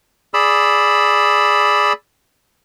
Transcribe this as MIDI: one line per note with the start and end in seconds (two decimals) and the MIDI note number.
0.34 1.93 68
0.34 1.93 74
0.34 1.93 83
0.34 1.93 88